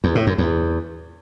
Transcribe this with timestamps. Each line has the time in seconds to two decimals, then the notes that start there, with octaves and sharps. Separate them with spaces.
0.04 E2
0.15 A2
0.27 F#2
0.38 E2